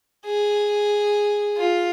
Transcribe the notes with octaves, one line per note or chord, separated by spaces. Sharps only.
G#4
F4